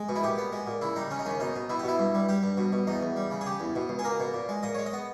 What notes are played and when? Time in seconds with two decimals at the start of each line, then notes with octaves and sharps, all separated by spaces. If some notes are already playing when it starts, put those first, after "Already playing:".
Already playing: G#3
0.09 B2
0.16 E4
0.23 A#2 G4
0.38 B3
0.52 G#3
0.67 A#2
0.81 C#3 E4
0.96 G3 D#4
1.10 C#3 C#4
1.19 D#4
1.26 D#2 C#4
1.40 B2 D#4
1.56 B2
1.69 B2 E4
1.79 G4
1.84 B2 E4
1.99 G2
2.14 G3
2.29 G3 G4
2.43 G2
2.57 B2
2.72 B2
2.87 E2 D#4
3.02 E2
3.16 G3
3.31 C#3
3.41 G#4
3.46 C#3 G4
3.60 E2
3.75 B2
3.89 C#2
3.99 G#4
4.04 A#3 A#4
4.20 B2
4.34 A#2
4.49 G#3
4.63 A#2 D#5
4.74 G#3 C#5
4.86 D#5
4.93 B3